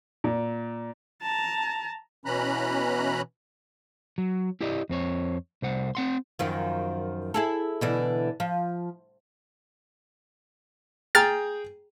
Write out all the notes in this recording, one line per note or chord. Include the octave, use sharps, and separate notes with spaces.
A#2
A5 A#5
B2 E3 C#4 A#5 B5 F#6
F#3
E4 G4 D5 D#5
F2 C4 C#5
C2 C5 F#5
C4 F#5 C6
F#2 D#3 F3
E4 G#4 A4
B2 D3 E3
F3
G#4 G5 A#5 F6 A6